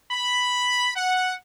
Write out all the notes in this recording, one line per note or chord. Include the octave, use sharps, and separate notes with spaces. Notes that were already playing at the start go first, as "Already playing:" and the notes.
B5
F#5